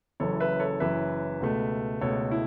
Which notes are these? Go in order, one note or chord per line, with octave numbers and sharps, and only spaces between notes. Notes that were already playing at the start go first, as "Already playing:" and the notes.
F#1 F#2 E3 A4 C#5
B4 E5
A4 C#5
F#1 F#2 E3 B4 E5
C#2 B2 A3
C#2 B2 A3 A4 C#5
E4